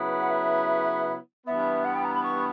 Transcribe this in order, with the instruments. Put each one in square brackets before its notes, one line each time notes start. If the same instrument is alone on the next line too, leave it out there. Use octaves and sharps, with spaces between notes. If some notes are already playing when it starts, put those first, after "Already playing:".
Already playing: [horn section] C#3 F#3 B3 E4 B4
[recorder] F#5
E5
[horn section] G2 E3 B3 [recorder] E5
[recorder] F#5
G5
A#5
B5
C#6